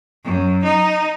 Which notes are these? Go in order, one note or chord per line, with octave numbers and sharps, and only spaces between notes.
F#2
D#4